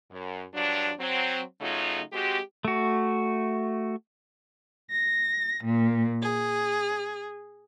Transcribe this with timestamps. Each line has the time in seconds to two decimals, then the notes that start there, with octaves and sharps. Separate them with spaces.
0.11 F#2
0.54 G2 F3 F#3 D4
1.00 F#3 C4
1.61 C#3 F#3 A3 D#4 F4
2.13 G#3 C4 F#4 G4
2.65 A3 F#4
4.91 A#6
5.65 A#2
6.21 G#4